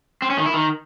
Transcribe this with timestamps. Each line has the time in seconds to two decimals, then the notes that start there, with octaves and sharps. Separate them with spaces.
0.22 C4
0.30 C#4
0.38 D#3
0.46 E4
0.54 D#3